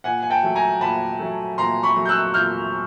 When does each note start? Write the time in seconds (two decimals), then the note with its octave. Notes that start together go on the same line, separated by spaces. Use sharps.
0.04 A#2 F#5 G#5
0.23 G#5
0.30 G5 A5
0.43 F#3 A3
0.55 G#5 A#5
0.81 A#2 A5 B5
1.19 F#3 A3
1.58 A#2 A#5 C6
1.83 B5 C#6
1.96 F#3 A3
2.05 G6
2.09 E6 F#6
2.34 A#2 F6 G6